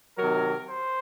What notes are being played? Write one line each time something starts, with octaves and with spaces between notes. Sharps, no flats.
C3 D#3 F#3 A#4
C5